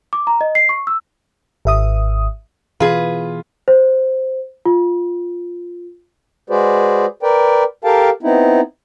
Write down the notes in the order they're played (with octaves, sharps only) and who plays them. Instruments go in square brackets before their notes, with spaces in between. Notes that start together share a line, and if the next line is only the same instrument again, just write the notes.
[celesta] D6
A#5
D#5
C7
C#6
E6
[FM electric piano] G#1 E5 D#6
[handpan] B2 E3 [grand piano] F4 [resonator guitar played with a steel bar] G#4 B4
[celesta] C5
F4
[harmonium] G#3 F#4 G#4 B4 C5 D5
A#4 B4 D5 G5
G4 A4 A#4 F5 G5 A5
B3 C4 D#4 E4